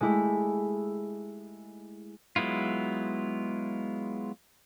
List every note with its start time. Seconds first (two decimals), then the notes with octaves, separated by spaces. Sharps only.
0.01 G#3 A3 E4 G4
2.36 F#3 G#3 B3 E4 F4